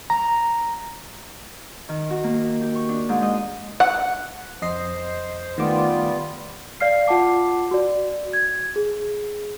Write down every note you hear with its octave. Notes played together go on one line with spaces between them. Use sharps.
A#5
D#3
F#4
A#3
G4
C#6
D4
G#2
D#5
F#5
F2 C5 D#5 C7
D#3 G3 A3 B3 F4 D6
D5 F5 F6 C7
F4 F#5 A5 D6 C7
F#4 D5
G#6
G#4